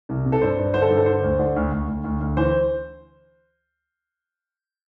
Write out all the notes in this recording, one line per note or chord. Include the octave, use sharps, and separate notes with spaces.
C2
C3
A4
G2 C5
G2
D3 C5
A4
G2
A4
D3 C5
D2
D3
D2
D2
D2
D2
D2
E3 C5